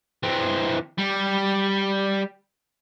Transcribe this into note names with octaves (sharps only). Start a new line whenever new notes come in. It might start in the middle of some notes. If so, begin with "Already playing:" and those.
E3 C4
G3